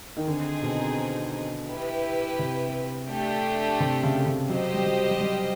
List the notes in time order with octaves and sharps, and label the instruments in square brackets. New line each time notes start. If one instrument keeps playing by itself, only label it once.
[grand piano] D#3
[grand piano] D3 [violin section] C4 D#4 G#4
[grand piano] B2
[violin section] E4 G4 B4
[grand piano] C3
[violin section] A3 D4 G4
[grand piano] C3
C#3
C#3
[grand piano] F#3 [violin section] G4 C5 D#5
[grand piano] G3
F#3
F#3
G3